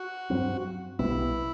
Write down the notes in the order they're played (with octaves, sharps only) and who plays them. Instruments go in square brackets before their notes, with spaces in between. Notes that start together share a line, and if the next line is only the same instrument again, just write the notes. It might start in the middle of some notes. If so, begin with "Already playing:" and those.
Already playing: [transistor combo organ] F#4
[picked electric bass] G2 F#3 C4
[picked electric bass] B1 B2 G3 B3 [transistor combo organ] E4